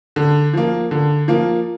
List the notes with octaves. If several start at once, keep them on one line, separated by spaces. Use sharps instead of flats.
D3
F3 A#3
D3
F3 A#3